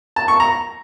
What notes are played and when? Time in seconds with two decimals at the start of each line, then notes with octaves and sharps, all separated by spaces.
0.16 A5
0.28 C#6
0.40 A#5